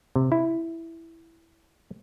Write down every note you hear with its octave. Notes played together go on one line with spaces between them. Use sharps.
C3
E4